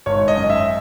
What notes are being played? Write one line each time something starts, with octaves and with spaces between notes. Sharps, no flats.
G#1 C#5
D#5
F#2
E5